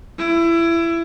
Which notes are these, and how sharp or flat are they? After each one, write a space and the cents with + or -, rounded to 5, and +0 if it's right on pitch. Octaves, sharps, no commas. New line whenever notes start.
E4 +25